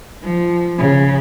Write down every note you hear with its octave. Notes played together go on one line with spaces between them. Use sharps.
F3
C#3